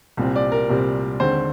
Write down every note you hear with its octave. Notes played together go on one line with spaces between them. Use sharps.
C2 A#2 G3 C4
D5
A#4
C2 A#2 G3 C4
D#2 D3 G#3 C4 C5